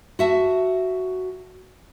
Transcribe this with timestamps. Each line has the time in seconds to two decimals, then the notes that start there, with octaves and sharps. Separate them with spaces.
0.19 F#4 E5 A5